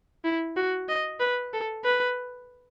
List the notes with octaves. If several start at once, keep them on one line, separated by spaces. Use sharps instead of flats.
E4
F#4
D#5
B4
A4
B4